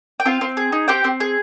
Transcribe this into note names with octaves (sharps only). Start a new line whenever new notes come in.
G5
C4 F4 F5
C4
G#4
D#4
C4 G4 G5
C4
G#4